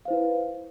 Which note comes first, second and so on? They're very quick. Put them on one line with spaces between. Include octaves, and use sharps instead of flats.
F5 C5 E4 B4